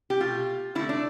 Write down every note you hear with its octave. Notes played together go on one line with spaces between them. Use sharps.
G4
B2 A3 F4
D3 A3 E4
D4